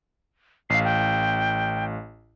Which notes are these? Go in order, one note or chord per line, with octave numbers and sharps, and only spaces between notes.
A1 F5 C7
G5